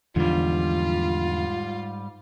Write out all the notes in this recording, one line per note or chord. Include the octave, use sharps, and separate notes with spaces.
E2 G#2 D3 F3 G3 F4